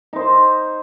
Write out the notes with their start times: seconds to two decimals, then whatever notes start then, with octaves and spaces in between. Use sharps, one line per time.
0.13 D#4 C5